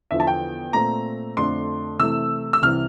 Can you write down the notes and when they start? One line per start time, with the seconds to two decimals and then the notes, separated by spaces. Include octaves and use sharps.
0.11 E2 D3 F3 E5
0.20 A5
0.27 G5
0.73 A#2 A3 C4 A#5
1.37 F2 D3 A3 D4 C6
1.99 C3 E3 A3 E6
2.53 E6
2.62 C2 C3 E3 F6